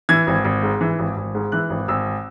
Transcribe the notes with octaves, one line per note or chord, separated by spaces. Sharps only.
E3 G#6
G#1
G#1
G#2
E3
G#1
G#1
G#2
E3 F#6
G#1
G#1 E6